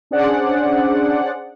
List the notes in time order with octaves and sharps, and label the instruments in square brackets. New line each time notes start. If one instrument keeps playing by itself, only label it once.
[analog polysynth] C#4 D4 G#4 C5 D5 F#5